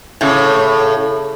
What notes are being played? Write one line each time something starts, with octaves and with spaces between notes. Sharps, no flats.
A2 C#3